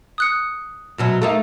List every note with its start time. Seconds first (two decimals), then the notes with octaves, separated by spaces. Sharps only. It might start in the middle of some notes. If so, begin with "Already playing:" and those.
0.18 D#6 F#6 C#7
0.98 F#2 B2 F#3
1.22 A3 A#3 D#4